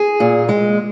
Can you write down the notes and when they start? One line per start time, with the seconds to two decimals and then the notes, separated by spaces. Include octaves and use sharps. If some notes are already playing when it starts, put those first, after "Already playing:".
Already playing: G#4
0.20 A#2
0.49 G#3